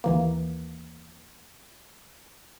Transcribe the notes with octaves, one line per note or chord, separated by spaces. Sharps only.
D#2 E3 A#3